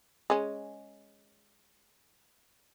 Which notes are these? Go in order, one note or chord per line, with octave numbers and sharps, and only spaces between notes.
G#3 C#4